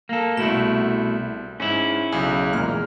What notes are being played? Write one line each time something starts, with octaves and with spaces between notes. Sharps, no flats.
A#3 A4
C2 B2 A3 E4 E7
G#2 C#4 E4
B1 C#3 G#5
E2 A#2 G#3 F6